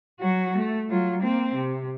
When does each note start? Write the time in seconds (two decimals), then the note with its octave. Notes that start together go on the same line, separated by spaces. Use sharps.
0.20 F#3 F#4
0.57 A3
0.89 F#3 F4
1.22 A#3 C4
1.55 C3